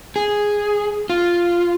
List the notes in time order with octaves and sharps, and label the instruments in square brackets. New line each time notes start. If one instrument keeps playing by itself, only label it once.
[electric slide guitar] G#4
F4